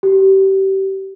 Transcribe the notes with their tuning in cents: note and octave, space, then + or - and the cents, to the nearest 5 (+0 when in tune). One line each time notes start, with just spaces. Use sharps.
G4 -30